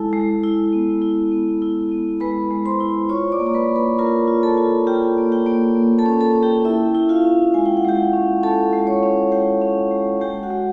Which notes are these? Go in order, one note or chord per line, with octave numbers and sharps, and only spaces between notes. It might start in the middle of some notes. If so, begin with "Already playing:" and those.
Already playing: G#3 E4 A4 A5
G#3
E4
B3
E4
B3
E4
B3
G#3 B4 B5
G#3
C5 C6
E4
F4 C#5 C#6
D5 D6
A#3
A#5
B4 B5
A#3
B4 B5
F4 A#4 A#5
F4
A4 A5
F4
F4 G4 G5
A#3
G4 G5
A#3
A#3
A4 A5
C#4
A4 A5
C#4
G4 G5
E4 E5
E4
F4 F5
C#4
G#3 G#5
G5
F#5
G#3 G4 G5
C#4
C#4 A4 A5
G#3
C#5 C#6
C#4
G#3 G4 G5
C#4
G#3
G#3 G4 G5
F#4 F#5
G#3